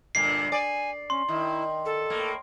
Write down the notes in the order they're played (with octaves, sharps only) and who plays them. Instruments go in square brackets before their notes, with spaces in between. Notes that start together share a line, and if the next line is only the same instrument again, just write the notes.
[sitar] G2 A#2 D3 [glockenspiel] C7
[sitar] D5 [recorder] G#5
[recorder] C#4 [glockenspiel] C6
[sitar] D#3 [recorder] E4
[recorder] A4
[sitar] A2 A#3